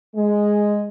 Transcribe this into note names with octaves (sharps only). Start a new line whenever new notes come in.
G#3